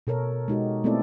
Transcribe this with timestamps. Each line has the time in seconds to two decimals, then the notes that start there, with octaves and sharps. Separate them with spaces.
0.07 B2 A4 A#4 C#5
0.48 G#3 D#4 F#4 G4
0.84 A3 B3 C4 E4 A4 D5